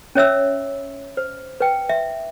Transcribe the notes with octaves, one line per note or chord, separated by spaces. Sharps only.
C#4 C#5 E5 E6
C5
B4 G5
E5